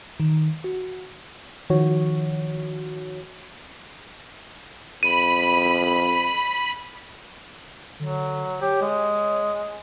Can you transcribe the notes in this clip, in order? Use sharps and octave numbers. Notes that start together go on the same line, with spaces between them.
D#3
F#4
D#3 F3 F#4 C#5
F2 B5 D#7
D3 F#3
G4 C#5
G#3